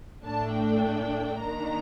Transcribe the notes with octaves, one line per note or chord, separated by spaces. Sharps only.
A2 A3 D4 A5
G5
D#3 A#3 D4 A#5